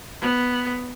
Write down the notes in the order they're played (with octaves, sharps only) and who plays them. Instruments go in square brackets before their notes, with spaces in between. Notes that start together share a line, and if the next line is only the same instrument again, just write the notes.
[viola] B3